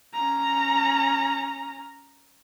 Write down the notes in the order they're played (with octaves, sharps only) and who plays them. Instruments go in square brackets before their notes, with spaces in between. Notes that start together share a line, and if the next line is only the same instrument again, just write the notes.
[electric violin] C#4 A#5